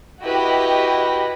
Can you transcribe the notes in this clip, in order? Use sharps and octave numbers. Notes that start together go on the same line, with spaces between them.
E4 F#4 G4 B4 D#5